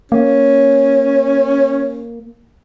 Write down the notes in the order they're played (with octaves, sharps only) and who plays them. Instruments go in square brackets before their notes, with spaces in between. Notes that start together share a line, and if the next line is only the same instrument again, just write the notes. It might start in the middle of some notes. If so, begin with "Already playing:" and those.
[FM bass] A#3 [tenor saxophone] C#4